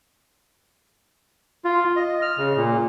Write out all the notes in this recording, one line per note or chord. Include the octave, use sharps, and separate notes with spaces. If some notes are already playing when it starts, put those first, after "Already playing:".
F4
D#5
F6
C#3
A#2